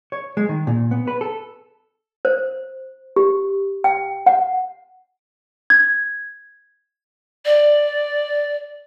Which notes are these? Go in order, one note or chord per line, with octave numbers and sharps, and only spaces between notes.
C#5
G#3
D#3
A#2
B3
B4
A4
C5
G4
G5
F#5
G#6
D5